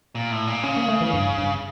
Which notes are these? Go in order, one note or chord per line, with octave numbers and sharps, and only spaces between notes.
A#2
A2
A#2
C#3 C#4
A#3
A3
E3
G2
G2